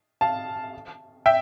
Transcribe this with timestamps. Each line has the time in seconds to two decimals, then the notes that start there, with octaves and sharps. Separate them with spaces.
0.21 F5 A5
1.26 E5 G5